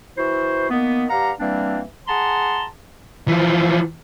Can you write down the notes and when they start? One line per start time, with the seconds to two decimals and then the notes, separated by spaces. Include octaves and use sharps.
0.17 E3 E4 F#4 C5
0.70 D#3 A#3 B3
1.10 G2 G4 F5 F#5 A#5
1.39 E3 G3 A#3 C4 D4
2.08 G#4 F#5 A5 A#5 C6
3.28 E3 F3